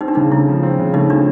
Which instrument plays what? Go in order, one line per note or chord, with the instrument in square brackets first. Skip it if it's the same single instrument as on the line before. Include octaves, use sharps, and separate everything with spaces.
[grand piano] C4 [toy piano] D#4
[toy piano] D4
[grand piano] C#3 [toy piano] D#4
[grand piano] A3 [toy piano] E4
[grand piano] F3
C4
C#3
[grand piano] A3 [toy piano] D#4
[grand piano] F3 [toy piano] D4